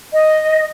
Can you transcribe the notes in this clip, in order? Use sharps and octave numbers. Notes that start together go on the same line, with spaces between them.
D#5